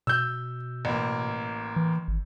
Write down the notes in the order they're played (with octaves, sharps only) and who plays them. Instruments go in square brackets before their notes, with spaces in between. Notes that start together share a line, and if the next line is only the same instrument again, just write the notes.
[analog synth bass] B2 [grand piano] E6 G6
[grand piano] A1 A#3
[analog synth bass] E3
G#1